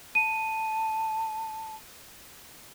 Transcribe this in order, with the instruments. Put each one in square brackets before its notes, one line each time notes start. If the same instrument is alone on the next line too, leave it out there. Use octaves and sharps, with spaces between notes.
[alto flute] A5 [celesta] D#7